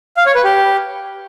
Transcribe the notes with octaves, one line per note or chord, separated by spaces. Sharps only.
F5
C#5
B4
G4